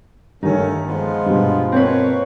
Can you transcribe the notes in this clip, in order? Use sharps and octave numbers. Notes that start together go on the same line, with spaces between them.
G2 D#3 A3 A#3 C#4 D#4
F3 G#3 B3 F4
G2 B2
A#3 C4 B4 C#5